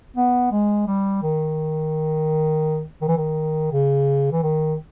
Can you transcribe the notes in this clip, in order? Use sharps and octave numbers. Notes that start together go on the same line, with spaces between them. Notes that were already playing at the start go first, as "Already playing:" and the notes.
B3
G#3
G3
D#3
D#3
E3
D#3
C#3
E3
D#3